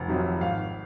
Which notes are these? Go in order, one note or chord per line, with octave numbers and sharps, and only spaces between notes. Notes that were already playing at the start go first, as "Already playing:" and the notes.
Already playing: F1
F2 C3 D#3 F#3
G#1 F5